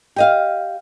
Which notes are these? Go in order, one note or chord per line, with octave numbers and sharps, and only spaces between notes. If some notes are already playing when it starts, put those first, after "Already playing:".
G4 D#5 F5